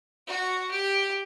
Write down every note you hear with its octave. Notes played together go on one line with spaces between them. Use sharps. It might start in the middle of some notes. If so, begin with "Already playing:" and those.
F#4
G4